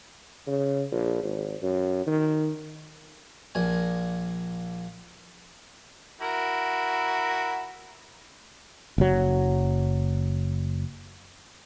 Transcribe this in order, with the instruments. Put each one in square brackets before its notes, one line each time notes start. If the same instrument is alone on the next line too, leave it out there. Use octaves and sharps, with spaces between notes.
[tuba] C#3
A#1
G#1
F#2
D#3
[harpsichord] A#1 A#2 G#5
[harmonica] E4 F#4 A#4
[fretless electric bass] F#1 F#3